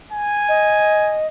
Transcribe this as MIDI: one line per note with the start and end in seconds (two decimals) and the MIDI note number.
0.12 1.17 80
0.48 1.27 75